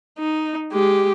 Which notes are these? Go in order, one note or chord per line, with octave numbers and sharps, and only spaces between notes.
D#4
G#3 G4